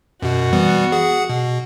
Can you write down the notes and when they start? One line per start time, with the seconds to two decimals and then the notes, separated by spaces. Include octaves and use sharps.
0.22 F#2 B2 F#4
0.53 E3 G3 B3
0.92 G#4 F#5
1.29 B2